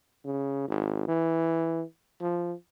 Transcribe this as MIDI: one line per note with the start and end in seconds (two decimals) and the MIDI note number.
0.24 0.66 49
0.68 1.04 32
1.08 1.82 52
2.21 2.53 53